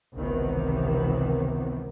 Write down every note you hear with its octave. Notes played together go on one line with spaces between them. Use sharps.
G#1 C#2 C3 D#3 E3 B3